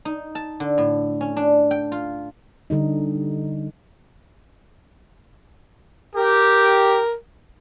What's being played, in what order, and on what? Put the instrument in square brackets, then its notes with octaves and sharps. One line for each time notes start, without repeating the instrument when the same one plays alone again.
[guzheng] D#4
A5
D3
A2
C#4
D4
G5
F4
[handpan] D3 G3 D#4
[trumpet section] G4 [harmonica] A#4